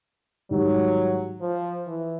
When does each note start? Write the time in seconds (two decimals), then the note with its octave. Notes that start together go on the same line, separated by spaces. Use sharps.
0.51 G#2 D#3 F#3 G3
1.41 F3
1.87 E3